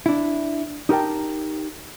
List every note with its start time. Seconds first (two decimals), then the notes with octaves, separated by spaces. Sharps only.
0.06 D4 E4
0.89 D#4 G4 A#4 G5 A5